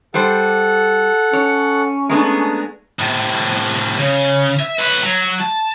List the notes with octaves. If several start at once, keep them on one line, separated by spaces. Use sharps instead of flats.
G3 A4 C5 F#5
C#4 C#5
G#3 A3 B3 D4 G#4 A#5
A2 C3
C#3
E5
B4 C#5
F#3
A5